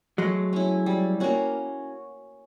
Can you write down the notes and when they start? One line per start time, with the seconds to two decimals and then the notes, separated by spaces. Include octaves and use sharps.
0.18 F#3 G#3 A3
0.53 C#4 E4
0.86 G3
1.20 A#3 C#4 F#4